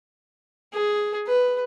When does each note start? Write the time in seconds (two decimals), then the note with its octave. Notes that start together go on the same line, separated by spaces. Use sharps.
0.73 G#4
1.27 B4